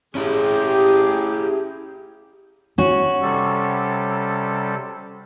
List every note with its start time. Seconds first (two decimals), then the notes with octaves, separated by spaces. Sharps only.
0.15 C#4 E4 G4 G#4
2.78 C#4 F#4
3.22 C3 G3 A4